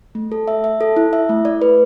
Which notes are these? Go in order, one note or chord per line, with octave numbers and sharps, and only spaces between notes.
A3
A4
E5
E5
A4
E4
E5
A3
D5
B4